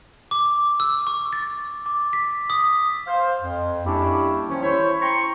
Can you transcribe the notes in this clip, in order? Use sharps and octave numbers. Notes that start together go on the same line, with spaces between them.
D6
E6
C#6
A6
D6
B6
D#6
C5 F5
F2
G3 A#3 C#4 D4 E4 G4
D#3 F3 C#4
E4 C5 C#5
G5 A#5 C6 C#6